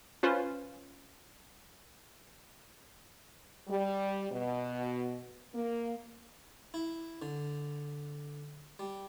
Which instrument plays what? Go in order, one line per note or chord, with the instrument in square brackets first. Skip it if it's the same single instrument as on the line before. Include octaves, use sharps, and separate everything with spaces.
[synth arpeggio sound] C#4 F4 B4 C5
[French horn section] G3
B2
A#3
[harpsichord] E4
D3
G3